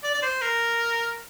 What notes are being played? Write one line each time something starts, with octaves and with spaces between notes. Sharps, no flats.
D5
D5
C5
A#4